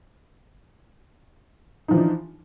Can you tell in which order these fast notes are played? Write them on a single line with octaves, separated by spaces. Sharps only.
D#4 F3 E3 D4